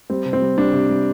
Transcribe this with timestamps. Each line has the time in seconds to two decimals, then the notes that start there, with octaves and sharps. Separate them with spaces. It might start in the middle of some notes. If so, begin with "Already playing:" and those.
0.10 G3 C4
0.26 C3
0.33 C4
0.42 G3
0.57 G3 D4
0.73 C3
0.89 G3